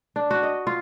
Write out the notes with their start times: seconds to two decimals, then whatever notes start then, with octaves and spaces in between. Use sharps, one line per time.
0.16 D4
0.31 F#4
0.43 D#5
0.67 F4